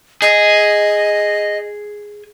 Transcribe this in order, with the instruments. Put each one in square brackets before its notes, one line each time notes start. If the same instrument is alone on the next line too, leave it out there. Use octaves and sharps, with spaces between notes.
[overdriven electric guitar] G#4 [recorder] D#5